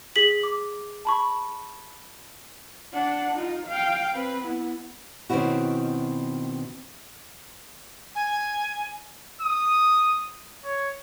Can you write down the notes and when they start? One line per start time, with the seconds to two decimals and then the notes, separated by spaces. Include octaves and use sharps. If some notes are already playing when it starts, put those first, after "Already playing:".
0.16 G#4 B6 F#7
0.43 D6
1.05 A5 B5 C#6
2.93 D4 F#5
3.35 D#4 F4
3.67 F5 G5
4.13 C4 B4
4.46 B3 E4
5.30 B2 D#3 C4 C#4 E4 F#4
8.15 G#5
9.42 D#6
10.64 C#5